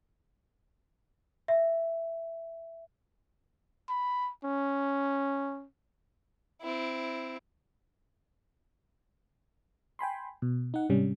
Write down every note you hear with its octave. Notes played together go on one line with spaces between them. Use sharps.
E5
B5
C#4
C4 E4
G5 G#5 B5 C6
B2
D#4 F#5
G#2 C3 G3 C#4